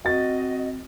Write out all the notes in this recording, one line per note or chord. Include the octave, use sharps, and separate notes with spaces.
C4 F#4 D#5 A6